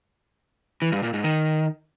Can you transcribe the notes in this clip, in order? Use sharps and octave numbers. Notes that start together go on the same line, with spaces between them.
E3
G2
A#2
G#2
D#3